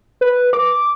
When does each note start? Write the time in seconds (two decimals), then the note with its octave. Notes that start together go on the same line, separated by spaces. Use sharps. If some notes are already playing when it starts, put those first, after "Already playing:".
0.21 B4
0.53 D6